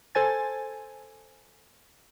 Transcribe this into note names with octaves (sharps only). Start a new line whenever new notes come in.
A4 C5 G#5 A6